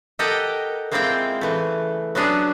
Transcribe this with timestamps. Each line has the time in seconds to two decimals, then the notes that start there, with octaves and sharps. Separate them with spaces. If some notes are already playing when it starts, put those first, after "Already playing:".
0.19 G4 A4 A#4 D#5 F#5 G5
0.92 G#3 A#3 C4 E4 F4 G5
1.41 C#3 E3 A3
2.15 F#3 B3 C#4 D4 G#4